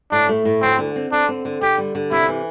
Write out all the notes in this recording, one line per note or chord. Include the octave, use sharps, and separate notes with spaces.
A2 D4
A3
A2
D2 C4
D3
C4
D3 D4
C4
D3
D3 G4
G3
D3
C3 E4
E3